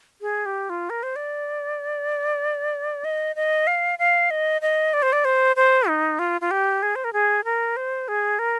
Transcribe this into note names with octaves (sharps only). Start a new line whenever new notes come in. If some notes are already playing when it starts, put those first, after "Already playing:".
G#4
G4
F4
A#4
C5
D5
D#5
D#5
F5
F5
D#5
D#5
D5
C5
D5
C5
C5
D#4
F4
F4
G4
G#4
C5
A#4
G#4
A#4
C5
G#4
A#4